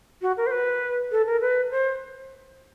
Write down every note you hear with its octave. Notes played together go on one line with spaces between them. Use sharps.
F#4
A#4
C5
B4
A4
A#4
B4
C5